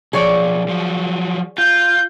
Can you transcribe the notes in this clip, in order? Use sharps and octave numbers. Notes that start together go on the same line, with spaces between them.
B1 F3 G#4 C#5 D5
F3 F#3
F4 G6